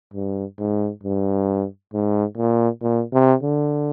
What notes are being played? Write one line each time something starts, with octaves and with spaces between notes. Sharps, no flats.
G2
G#2
G2
G#2
A#2
A#2
C3
D3